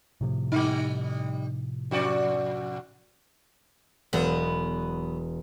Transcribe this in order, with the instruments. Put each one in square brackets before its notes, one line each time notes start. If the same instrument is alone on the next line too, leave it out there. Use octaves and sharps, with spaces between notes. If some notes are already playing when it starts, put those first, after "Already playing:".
[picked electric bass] A2 C3 F3
[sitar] G3 D#4
F2 F#4 D5
[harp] E1 E7 [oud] F#3 B3